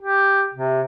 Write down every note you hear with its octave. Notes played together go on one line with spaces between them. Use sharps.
G4
C3